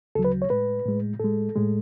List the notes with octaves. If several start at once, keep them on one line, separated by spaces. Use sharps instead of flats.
D2 C#3 F#3 A4
B4
C#5
A2 G#3 B4
A2 G#3
A2 G#3 A4
A2 G#3